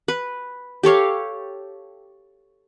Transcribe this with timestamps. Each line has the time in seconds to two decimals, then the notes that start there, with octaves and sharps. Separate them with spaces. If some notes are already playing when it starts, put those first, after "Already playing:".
0.08 B4
0.83 G4 A4 C#5 F5